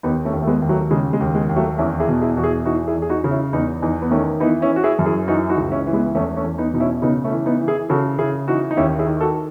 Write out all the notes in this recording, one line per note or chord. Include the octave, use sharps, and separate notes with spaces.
D#2 B3 D#4
A3 C#4
D#2
A3
G#3 B3
D#2
F#3 A3
C#3 G#3
G#3
D#2
G#3
D#2
F#3 A3
E2 C#4 E4
E4 G#4
B2
E4 G#4
E2 F#4
E4 G#4
E3 D#4 F#4
E4 G#4
E2
G#4
D#4 F#4
C#3
C#4 E4
E2 B3 D#4
E2 B3 D#4
B3
D#3 A3 C#4
E3 B3 D#4
C#4 E4
E3
F#4
E4 G#4
F#2
E4 G#4
E3 D#4 F#4
D#4 F#4
C#2
C#4 E4
E3
G#3 B3
E2 A3 C#4
A3 C#4
E2
B3 D#4
B2 D#4
C#4 E4
C#3 B3 D#4
A3 C#4
E3
B3 D#4
E3
E4 G#4
C#3 F#4 A4
C#3 E4 G#4
E3 D#4 F#4
D#4
D#2 C#4 E4
E4 G#4
D#3
F#4 A4